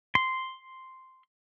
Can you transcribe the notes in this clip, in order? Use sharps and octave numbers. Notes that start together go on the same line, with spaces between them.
C6